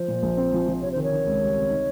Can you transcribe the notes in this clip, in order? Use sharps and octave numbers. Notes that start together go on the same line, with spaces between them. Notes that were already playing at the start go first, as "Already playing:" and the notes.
Already playing: F3 C5
A#2
A#1
C4
F3
F3
C3 C#5
D#3 C5
C#5
D#3
C#2
G3
C3
D#4